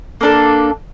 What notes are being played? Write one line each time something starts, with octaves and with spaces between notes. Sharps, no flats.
A#3 D4 A4